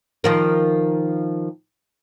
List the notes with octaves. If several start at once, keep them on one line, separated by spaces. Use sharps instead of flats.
D#3 F3 A#4